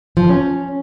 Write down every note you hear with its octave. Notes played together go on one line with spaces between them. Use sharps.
F3
C#4